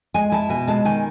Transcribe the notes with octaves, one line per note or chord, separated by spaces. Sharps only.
G#3 G#5
E4 A5
B2 G#5
G#3 A5
D#3 G#5